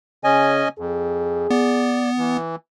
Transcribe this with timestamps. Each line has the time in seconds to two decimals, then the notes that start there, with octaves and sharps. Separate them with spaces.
0.24 C#3 C#4 D#5 G#5
0.79 F2 G#4
1.51 B3 D5
2.18 E3